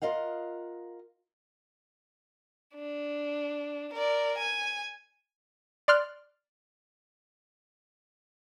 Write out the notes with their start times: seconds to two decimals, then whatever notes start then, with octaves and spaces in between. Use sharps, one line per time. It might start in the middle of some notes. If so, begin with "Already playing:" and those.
0.02 F4 A#4 D#5 F5 F#5
2.75 D4
3.93 A#4 D5
4.38 G#5
5.88 D5 C6 F6 F#6